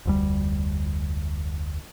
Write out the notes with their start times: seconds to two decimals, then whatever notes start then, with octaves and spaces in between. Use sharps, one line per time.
0.06 F1 D2 G3